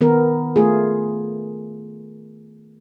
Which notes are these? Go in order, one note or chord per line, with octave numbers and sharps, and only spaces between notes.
D#3 B3 A#4
A3 F4 G#4